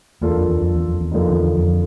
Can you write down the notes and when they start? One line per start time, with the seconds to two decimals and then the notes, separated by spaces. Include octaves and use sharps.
0.21 E2 A#3 D4 F4 A4
0.35 F2
0.49 E2
0.62 F2
0.75 E2
0.88 F2
1.01 E2
1.11 F2 D3 F3 A#3 D#4
1.28 E2
1.57 F2